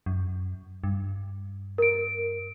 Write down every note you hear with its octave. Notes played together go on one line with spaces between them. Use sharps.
F#2
G2
A#4 D7